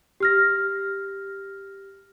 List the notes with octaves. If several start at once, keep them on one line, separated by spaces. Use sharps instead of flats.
G4 F6 A#6